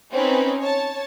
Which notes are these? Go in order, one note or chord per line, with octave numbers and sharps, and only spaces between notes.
C4 C#4 D#4 B4
C#5 A5